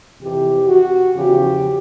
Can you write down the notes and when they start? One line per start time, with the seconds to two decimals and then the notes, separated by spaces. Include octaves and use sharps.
0.20 F2 C3 E3 G4
0.67 F#4
1.14 E2 C#3 F3 G4